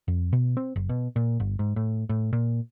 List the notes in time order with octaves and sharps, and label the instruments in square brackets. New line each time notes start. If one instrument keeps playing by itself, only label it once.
[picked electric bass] F2
B2
C4
F#1
B2
A#2
G1
G#2
A2
A2
A#2